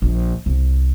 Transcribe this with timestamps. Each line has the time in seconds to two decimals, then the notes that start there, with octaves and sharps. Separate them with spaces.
0.02 A#1
0.46 C2